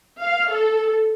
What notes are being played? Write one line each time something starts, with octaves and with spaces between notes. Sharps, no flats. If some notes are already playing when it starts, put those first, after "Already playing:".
F5
A4